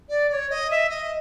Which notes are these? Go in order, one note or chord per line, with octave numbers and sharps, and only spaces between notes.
D5
D5
C#5
D#5
E5
D#5